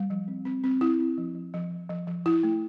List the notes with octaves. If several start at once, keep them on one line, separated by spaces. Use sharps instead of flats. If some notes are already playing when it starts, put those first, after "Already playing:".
Already playing: G3
F3
C4
C4
C4
C4 E4
C4
F3
F3
F3
F3
F3
F3
F3 E4
A3